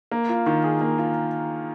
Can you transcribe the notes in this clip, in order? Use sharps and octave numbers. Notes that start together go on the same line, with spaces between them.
A#3
F4
D#3
G#4
A#3
F4